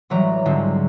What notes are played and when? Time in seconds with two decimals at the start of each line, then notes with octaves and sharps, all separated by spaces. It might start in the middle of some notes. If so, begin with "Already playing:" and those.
0.10 A1 E3 F#3 G3 A#5
0.46 C#2 G#2 D3 F#3 C4